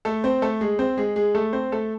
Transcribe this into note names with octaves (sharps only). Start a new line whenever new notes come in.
A3 A4
C4 C5
A3 A4
G#3 G#4
C4 C5
G#3 G#4
G#3 G#4
A3 A4
C4 C5
A3 A4